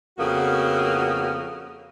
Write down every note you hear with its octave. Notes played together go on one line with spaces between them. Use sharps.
F2 C#3 A#3 B3 F#4